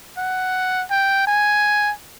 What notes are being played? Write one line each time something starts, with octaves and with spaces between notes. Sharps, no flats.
F#5
G5
G#5